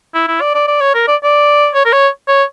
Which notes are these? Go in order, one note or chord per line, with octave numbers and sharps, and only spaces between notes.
E4
E4
D5
D5
D5
C#5
A#4
D5
D5
C#5
A#4
C#5
C#5